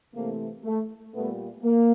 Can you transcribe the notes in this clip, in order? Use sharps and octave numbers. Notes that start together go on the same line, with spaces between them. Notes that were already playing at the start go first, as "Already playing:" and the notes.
C3 E3 A3 A#3
A3
A#2 G3 A3 B3
A#3